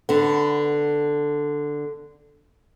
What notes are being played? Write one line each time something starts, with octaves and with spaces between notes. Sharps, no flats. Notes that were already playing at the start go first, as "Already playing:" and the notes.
D3 B3